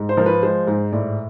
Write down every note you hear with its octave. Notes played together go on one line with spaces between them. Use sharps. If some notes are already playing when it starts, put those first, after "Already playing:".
Already playing: G#2
C5
F3 A#4
B4
G#3 C5
G#2
A2 D5